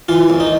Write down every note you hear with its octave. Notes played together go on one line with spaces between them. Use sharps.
E3 F4
C2
D#4